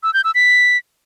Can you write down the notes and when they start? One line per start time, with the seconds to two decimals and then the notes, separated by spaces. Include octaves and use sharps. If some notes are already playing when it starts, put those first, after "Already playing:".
0.03 E6
0.14 G6
0.24 E6
0.35 B6